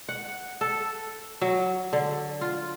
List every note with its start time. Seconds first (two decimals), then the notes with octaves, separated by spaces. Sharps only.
0.09 F#5
0.61 A4
1.41 F#3
1.93 D3
2.41 F4